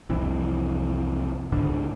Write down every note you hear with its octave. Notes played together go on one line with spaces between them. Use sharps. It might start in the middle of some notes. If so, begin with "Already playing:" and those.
C2 F2 C3 E3
C#2 G#2 D3 D4